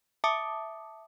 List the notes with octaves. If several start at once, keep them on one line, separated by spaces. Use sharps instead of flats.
E5 A5 D6 D#6 C#7